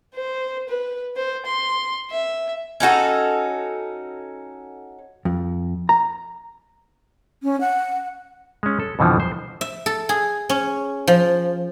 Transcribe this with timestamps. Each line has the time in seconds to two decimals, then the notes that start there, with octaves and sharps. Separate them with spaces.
0.15 C5
0.68 B4
1.16 C5
1.46 C6
2.10 E5
2.80 C#4 D#4 F#4 A4
5.25 F2
5.89 A#5
7.43 C#4
7.61 F#5
8.63 G#3 C#4
8.80 A4
8.99 F2 B2 D3 E3 F3
9.20 C5
9.61 E5
9.86 A4
10.09 G#4
10.49 C#4
11.07 F3